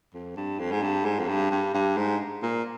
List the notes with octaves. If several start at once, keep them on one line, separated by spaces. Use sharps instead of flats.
F2
G2
F2
G#2
G2
G#2
F2
G2
G2
G2
G#2
A#2